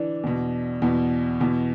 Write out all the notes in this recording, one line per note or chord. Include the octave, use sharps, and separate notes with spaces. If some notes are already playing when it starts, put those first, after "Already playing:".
Already playing: E3 D4
E2 B2
E2 B2
E2 B2